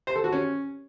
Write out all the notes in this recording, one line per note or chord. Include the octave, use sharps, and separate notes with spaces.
C5
A4
F#4
C#4